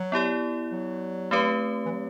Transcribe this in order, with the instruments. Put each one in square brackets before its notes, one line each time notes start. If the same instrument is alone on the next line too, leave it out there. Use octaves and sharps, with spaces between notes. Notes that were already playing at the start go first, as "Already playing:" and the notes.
Already playing: [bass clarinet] F#3
[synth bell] B3 E4 G4 D5
[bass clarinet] F#3
[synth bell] A3 C4 G4 B4
[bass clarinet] E3
F#3